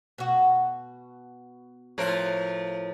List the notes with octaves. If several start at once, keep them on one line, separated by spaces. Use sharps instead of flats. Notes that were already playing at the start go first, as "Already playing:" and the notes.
B2 F#4
A2 F3 A#4